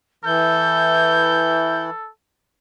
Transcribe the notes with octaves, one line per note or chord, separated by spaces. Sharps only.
E3 E4 A4 G6